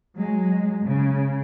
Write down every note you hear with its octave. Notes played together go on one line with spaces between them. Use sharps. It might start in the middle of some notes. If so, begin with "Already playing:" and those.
F#3 G#3
C#3